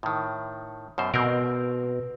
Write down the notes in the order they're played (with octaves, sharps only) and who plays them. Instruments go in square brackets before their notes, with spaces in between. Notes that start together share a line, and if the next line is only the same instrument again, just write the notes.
[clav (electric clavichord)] A2 D#3
F#2 B2 C5
[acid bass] B2 [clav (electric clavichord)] C4 A#4